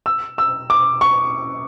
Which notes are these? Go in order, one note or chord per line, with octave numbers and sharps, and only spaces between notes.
E6
E6
D6
C#6